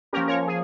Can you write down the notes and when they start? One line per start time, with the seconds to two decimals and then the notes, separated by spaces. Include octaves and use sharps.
0.13 F3 A#3 C#4 G4 A#4
0.28 A#4 C#5
0.47 G#4